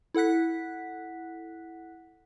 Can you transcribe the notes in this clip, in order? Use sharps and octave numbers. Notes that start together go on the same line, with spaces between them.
E4 A4 F#5 F#6 B6